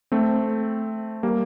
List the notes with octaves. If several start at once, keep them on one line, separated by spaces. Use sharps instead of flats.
A3 C4
G3 A#3